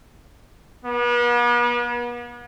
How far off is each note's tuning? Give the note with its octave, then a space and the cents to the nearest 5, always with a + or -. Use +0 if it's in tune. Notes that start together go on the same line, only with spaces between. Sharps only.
B3 -40